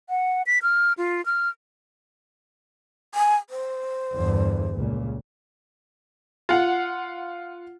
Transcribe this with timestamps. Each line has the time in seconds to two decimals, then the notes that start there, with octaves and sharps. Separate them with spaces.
0.09 F#5
0.47 B6
0.63 F6
0.98 F4
1.26 F6
3.15 G#5
3.50 C5
4.13 E2 G2 D3
4.75 C#2 A#2
6.49 F4 F#5